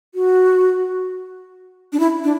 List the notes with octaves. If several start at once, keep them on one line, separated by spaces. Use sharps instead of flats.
F#4
D4
E4
D4